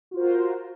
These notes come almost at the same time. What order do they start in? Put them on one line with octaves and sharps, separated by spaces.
F#4 F4 C5 A#4